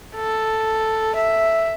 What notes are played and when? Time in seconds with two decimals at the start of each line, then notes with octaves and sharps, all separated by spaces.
0.16 A4
1.15 E5